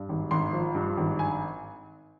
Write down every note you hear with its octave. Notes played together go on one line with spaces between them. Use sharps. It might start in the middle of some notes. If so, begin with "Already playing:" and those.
Already playing: G2
G#1
G#1 C6
F3
G2
G#1
G#5